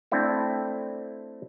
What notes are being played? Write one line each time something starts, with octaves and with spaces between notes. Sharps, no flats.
A3 C4 D4 E4 A4